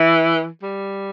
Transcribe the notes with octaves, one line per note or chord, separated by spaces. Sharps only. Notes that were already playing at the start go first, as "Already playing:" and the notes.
Already playing: E3
G3